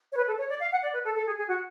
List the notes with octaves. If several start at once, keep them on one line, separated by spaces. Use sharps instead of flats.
C#5
B4
A4
C#5
D5
F5
F#5
D5
B4
A4
A4
G#4
G#4
F#4